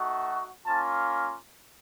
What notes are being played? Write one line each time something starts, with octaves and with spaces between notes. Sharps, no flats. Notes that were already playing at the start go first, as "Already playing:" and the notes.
Already playing: A3 D#4 F#4
A#3 C#4 F4 A5